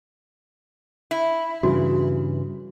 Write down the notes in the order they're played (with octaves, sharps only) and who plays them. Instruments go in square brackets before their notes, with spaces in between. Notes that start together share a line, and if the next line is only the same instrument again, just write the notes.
[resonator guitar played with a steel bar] E4
[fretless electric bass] G2 C#3 E3 [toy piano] F#4